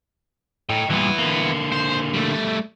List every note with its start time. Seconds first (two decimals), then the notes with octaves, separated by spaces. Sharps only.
0.69 A2 D#5 G5
0.90 G2 A#2 E3 B3
1.18 D3 A#3
1.73 C5
2.14 G3 A3